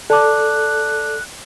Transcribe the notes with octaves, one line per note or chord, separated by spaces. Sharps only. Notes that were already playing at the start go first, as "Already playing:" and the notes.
A4 D5 A5 D6 F#6